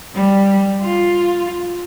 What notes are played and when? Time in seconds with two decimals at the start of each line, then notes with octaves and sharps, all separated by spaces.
0.15 G3
0.82 F4